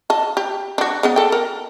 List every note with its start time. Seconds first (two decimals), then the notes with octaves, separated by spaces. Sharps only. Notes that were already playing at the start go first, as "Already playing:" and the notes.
0.10 D#5 A5
0.37 G4
0.78 D4 F#4
1.03 C#3 B3 D#5
1.16 A4 G5
1.32 A#4